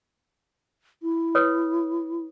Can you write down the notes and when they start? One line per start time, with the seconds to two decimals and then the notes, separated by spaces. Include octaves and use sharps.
1.03 E4
1.35 B4 C#5 D#6